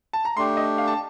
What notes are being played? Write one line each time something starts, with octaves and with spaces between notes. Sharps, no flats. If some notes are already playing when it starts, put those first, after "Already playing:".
A5
A#5
A3 D4 G4 C6
D#5
F5
A5